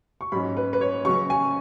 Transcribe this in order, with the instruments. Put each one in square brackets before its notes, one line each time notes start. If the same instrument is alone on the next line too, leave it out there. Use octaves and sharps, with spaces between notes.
[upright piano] C#6
G#2 F#3 C#4 B5
B4
B4
C#5
C#3 F#3 C#4 C#6
G#5